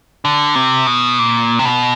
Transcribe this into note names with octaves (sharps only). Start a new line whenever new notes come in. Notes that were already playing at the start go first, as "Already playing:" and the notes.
D3
C3
B2
A#2
C3
B2